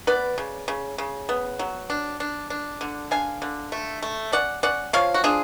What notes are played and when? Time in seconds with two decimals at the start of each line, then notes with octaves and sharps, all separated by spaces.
0.07 B3 B4 D5
0.38 C#3
0.68 C#3
0.98 C#3
1.29 B3
1.59 F#3
1.90 D4
2.20 D4
2.50 D4
2.81 D3
3.11 D4 F5 G#5
3.42 D3
3.72 A3
4.02 A3
4.33 C#4 D5 F#5
4.63 C#4 D5 F#5
4.93 F3 C#5 F5
5.14 F#4
5.24 D4 F4 G#4